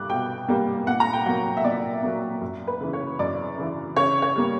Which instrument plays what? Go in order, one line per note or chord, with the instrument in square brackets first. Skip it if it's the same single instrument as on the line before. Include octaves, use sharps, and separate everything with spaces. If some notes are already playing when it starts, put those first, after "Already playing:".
Already playing: [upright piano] G3 D6 F#6
B2 G5
G3 A#3
A#2 F#5
A#5
G5
F#3 A#3 F#5
E5
A#2 D5
F#3 A#3
F#2
B4
C#3 E3
C#5
F#2 D5
C#3 E3
C#3 C#5
C#5
G3 A#3